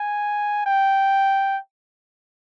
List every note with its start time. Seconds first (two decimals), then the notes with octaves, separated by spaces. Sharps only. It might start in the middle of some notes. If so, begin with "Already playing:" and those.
Already playing: G#5
0.67 G5